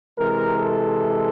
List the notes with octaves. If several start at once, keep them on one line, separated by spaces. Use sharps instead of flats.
C3 E3 G#3 A#4
A4